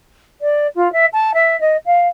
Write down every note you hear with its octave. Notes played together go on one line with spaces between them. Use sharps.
D5
F4
E5
A5
E5
D#5
F5